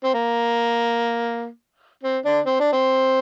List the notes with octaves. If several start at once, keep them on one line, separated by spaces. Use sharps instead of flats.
C4
A#3
C4
D3 D4
C4
D4
C4